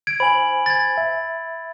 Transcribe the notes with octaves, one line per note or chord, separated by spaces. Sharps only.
G#6 D7
C5 G#5 B5 F#7
G#6 A6
E5